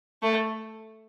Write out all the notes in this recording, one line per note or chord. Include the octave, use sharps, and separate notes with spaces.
A3